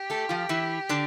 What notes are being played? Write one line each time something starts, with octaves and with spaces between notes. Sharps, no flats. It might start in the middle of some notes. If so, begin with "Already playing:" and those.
Already playing: G4
A3 A4
F3 F4
E3 E4
D3 D4